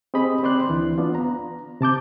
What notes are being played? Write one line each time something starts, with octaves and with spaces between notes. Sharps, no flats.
C4 G4 G#4 D#5 B5
C4 C5 D5 C6 F#6
D2 E3 D4
B3 D4 F4
A#5
C3 A5 D6 G6